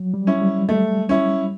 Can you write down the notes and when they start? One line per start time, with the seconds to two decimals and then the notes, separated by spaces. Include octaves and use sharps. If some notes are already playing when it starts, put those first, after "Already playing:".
Already playing: F#3
0.14 G3
0.27 C#4 E4
0.41 G3
0.68 G3 A3
1.09 C#4 E4